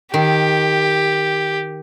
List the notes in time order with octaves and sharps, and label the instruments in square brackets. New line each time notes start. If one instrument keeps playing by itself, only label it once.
[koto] D#3 [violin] G4